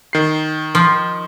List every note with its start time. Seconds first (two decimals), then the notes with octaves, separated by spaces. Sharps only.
0.13 D#3 C7
0.75 F3